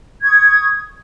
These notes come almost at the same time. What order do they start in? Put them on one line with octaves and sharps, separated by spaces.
G#6 C#6 D#6